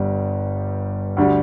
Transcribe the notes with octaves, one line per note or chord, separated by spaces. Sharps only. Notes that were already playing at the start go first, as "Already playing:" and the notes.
Already playing: G1 G2 G3
D2 D3 G3